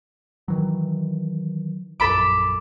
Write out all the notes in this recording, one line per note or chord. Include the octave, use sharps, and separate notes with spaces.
D#3 E3 F#3
A#1 F#2 A4 B5 D6